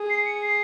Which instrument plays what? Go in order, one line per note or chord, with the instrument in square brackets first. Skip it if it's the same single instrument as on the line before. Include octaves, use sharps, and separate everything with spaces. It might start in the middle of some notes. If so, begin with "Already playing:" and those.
Already playing: [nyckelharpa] G#4
[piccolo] C7
C#7
C7